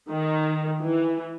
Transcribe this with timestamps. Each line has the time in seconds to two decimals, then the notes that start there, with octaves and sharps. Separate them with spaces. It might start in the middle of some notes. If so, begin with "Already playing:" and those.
0.10 D#3
0.82 E3